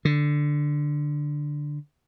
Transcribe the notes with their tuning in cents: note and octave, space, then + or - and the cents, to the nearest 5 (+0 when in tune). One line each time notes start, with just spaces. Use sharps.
D3 +5